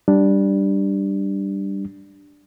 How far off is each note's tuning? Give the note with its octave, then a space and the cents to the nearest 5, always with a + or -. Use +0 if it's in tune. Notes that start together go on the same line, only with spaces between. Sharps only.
G3 +0 D4 +0